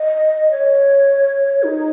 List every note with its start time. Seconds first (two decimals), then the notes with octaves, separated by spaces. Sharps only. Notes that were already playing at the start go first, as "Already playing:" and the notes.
Already playing: D#5
0.51 C#5
1.63 D#4